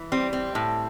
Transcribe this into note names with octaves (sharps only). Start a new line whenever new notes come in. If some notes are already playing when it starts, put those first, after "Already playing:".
Already playing: E3
G3 C4
C4
A2